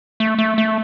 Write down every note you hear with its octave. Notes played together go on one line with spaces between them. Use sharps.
A3
A3
A3